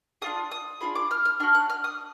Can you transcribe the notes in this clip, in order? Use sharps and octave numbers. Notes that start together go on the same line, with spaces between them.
D4 F4 G#4 D#6
D#6
D4 F4 G#4 B5
D6
F6
F6
D4 F#4 F6
F#6
F6
D#6